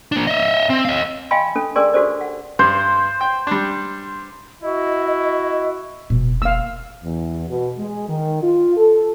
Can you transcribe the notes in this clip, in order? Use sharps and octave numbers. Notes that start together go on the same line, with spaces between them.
A#3 D4
D#5 E5
C4
D#5 F5
D#5 F5 G5 G#5 B5 C6
C#4 D4 A4
C#4 G#4 A#4 D5 G#5 C6
D4 F#4 G4 A4 C5 D5
F#5
G2 C5
G5
G3 D4
E4 F#4 D#5
F1 B2
A#3 F5 E6
E2
B2
G#3
D#3
F4
A4